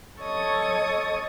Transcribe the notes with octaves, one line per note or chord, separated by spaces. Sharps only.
A4 C#5 D#5 C#6 D#6